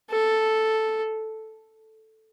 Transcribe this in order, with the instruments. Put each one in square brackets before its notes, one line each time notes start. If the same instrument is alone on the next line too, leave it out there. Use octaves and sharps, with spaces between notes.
[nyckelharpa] A4